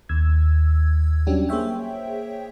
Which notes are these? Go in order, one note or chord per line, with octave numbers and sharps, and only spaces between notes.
D#2 E6 G#6
F#3 G3 C#4 D4 F#4 G4
A#3 G#4 C5 C#5 E5 G5